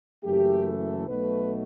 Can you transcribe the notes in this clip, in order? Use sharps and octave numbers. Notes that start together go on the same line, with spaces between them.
F#1 F#2 E3 A3 G4
A4
B1 B2 A3 B4